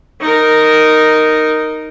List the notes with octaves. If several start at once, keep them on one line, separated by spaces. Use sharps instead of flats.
D#4 A#4